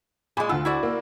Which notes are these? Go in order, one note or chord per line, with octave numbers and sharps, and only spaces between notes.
A#2 G#3 G#5 B5
D2 F4 F#5 E6
E4 F#4 D5
A#3